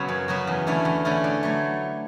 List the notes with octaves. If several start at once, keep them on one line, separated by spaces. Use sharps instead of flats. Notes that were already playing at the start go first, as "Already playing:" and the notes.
Already playing: C#3 F#3 B3 F#4
F#2
C#3 F#3 B3 F#4
E2
D3 A3 C#4 E4
E2
D3 A3 C#4 E4
D3
F#3 A3